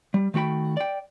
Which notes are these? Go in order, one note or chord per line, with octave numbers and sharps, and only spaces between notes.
G3
D#3 A3 F#4 G5 B5
D5 G5